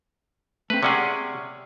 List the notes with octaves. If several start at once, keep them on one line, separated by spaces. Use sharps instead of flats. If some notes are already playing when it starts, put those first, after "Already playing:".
A3 C4 B4
C3 C#4 G#4 C#5 D5 F#5